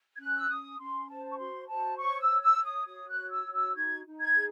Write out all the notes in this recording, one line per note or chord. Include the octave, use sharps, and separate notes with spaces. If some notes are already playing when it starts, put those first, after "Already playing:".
G#6
C#4 F#6
E6
C#4 D#6
C#4 C6
C5 A5
C#6
F#4 C6
C5 A5
C#5 C#6
E6
C#5
E6
C#5
D#6
F#4 D#6
F#6
C#5
E6
F#4
E6
D#4 G#6
D#4
G#6
G#4